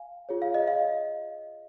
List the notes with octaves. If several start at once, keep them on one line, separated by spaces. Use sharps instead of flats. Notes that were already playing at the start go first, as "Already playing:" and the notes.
Already playing: F5 G#5
F4 G#4 C#5
F5
D#5
F5